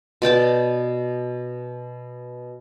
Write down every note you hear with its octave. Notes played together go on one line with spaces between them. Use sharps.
B2 D5 G5 A5